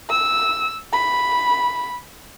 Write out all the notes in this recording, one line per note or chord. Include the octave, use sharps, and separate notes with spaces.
E6
B5